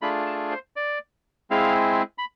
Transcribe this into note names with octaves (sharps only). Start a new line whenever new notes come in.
A3 D4 F4 G#4 B5
A5
C5
D5
G#3 C4 E4 G#4 F5
B5